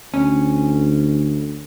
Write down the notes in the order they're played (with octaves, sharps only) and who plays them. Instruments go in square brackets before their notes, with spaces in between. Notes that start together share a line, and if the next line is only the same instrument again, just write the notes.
[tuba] D2 [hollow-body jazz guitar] C#4